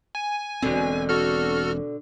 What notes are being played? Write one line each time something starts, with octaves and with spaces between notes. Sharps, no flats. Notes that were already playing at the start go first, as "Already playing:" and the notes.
G#5
E1 B2 D3 C4
F#4 A4 F6